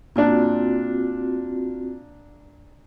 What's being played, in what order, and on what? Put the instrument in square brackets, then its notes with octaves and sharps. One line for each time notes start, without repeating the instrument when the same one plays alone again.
[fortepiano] A#2 D4 [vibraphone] C4 F4 F#4